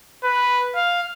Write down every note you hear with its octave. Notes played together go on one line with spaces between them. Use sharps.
B4
F5